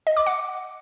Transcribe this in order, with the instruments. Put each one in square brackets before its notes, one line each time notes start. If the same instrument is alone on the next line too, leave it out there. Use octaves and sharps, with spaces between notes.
[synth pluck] D#5
D6
F#5